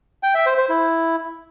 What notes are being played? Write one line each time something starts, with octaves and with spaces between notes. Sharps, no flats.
G5
E5
C5
C5
E4